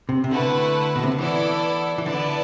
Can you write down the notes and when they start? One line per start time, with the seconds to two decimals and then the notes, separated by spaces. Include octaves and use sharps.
0.09 C3
0.24 C3
0.31 D3 A3 E4 B4 F#5
0.96 B2
1.03 C3
1.11 D3
1.19 E3 B3 E4 A4 D5
1.98 E3
2.06 D3 B3 E4 B4 D5 A5